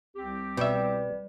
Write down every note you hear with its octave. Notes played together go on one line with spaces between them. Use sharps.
C2 C4 G4
B2 G3 B4 D5 E5